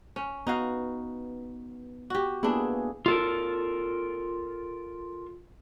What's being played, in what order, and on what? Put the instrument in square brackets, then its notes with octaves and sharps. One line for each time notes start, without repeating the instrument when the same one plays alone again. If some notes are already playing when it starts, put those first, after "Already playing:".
[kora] C#4
[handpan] B3 [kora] D#4 F#4 F5
[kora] F#4 G4
[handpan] A#3 B3 G#4 [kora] D4 E4
[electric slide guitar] F4 A4 A#4